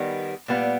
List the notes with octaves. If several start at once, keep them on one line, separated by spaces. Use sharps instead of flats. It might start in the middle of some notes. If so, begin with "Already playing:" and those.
Already playing: D#3 G3 B3
A#2 G3 B3